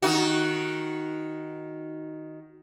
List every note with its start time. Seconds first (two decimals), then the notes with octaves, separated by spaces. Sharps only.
0.02 D#3 D#4 F#4